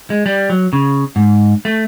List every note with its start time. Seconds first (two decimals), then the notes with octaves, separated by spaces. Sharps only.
0.10 G#3
0.26 G3
0.50 F#3
0.73 C#3
1.16 G#2
1.65 A3